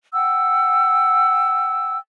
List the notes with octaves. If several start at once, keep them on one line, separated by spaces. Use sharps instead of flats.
F#5 G5 E6